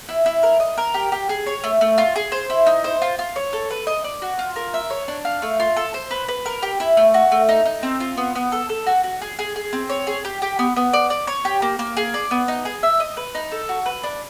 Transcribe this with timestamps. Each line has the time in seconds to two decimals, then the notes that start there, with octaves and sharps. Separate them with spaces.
0.09 E4
0.26 E4
0.43 A#4
0.60 D#5
0.78 A#4
0.94 G4
1.12 G4
1.29 G#4
1.46 C#5
1.64 A3
1.81 A3
1.98 F4
2.16 G#4
2.32 C5
2.50 E4
2.66 D#4
2.84 C5
3.02 F4
3.19 F4
3.36 C#5
3.53 A4
3.70 B4
3.87 D#5
4.04 D5
4.22 F#4
4.39 F4
4.56 A#4
4.74 E5
4.90 C#5
5.08 D4
5.25 F5
5.42 A3
5.60 F4
5.76 A4
5.94 C5
6.11 B4
6.28 B4
6.46 A#4
6.62 G4
6.80 E4
6.97 A3
7.14 F#4
7.32 A3
7.49 D#4
7.66 D#4
7.83 C4
8.00 F4
8.17 B3
8.35 B3
8.52 A4
8.69 A4
8.86 F#4
9.04 F#4
9.21 G#4
9.39 G#4
9.56 G#4
9.73 C4
9.89 C#5
10.07 G#4
10.25 G4
10.42 G4
10.59 B3
10.76 B3
10.93 D5
11.10 D5
11.27 C#5
11.45 G4
11.62 A#3
11.79 A#3
11.97 G#4
12.14 D5
12.31 B3
12.48 D#4
12.65 G#4
12.83 E5
13.00 D#5
13.17 B4
13.35 D#4
13.52 A4
13.69 F#4
13.86 B4
14.03 D4